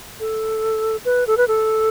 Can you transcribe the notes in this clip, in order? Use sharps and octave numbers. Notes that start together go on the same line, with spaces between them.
A4
B4
A4
B4
A4